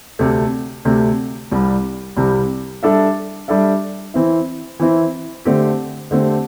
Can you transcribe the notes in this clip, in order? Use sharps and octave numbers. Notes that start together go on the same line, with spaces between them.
D2 C3 A3
D2 C3 A3
C2 C3 G3
C2 C3 G3
G3 D4 A4 E5
G3 D4 A4 E5
E3 C4 E4
E3 C4 E4
D3 A3 C4 G4
D3 A3 C4 G4